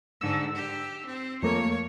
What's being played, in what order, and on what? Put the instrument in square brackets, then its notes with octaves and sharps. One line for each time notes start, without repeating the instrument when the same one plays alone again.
[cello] G#2 D3 [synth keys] E6
[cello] G4
C4
[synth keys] F2 A3 A#3 [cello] C#5